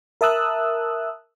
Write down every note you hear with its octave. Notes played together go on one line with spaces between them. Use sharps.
A#4 E5 A5 D#6 E6 F#6